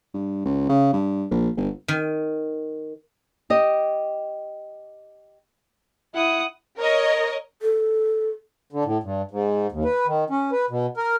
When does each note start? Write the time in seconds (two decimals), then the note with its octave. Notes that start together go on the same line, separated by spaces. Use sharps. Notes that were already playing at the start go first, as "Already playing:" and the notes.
0.14 G2
0.45 C#2
0.69 C#3
0.93 G2
1.31 A#1
1.57 G1
1.88 D#3
3.50 G4 D#5
6.14 E4 F#5 D#6
6.79 A#4 C#5 D#5
7.62 A4
8.73 D3
8.85 A2
9.03 G2
9.31 G#2
9.72 D#2
9.85 B4
10.07 D#3
10.30 C#4
10.52 B4
10.70 B2
10.97 A#4